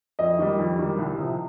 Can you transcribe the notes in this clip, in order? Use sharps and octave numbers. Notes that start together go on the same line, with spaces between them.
F2 D#5
D#3 G3
F2
D#3 G3
C2
C3 F3